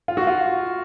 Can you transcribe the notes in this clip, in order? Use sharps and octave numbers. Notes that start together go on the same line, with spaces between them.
F4
F#4
F4